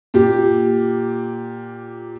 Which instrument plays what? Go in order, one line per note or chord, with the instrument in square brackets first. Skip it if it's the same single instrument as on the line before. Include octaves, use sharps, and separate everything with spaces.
[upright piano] A#2 G4